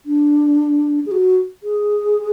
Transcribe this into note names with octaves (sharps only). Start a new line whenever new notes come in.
D4
G#4
F#4
G#4